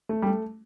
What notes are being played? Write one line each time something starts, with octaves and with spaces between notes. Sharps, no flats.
A3
G3
A3